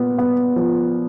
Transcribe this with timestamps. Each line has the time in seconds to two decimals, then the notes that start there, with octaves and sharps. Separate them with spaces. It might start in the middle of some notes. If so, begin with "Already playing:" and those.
Already playing: A#2 B3
0.18 B3
0.56 F3